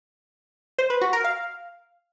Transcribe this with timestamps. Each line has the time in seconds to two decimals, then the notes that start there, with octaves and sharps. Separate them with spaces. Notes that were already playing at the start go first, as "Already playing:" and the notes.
0.78 C5
0.90 B4
1.01 F#4
1.13 A#4
1.24 F5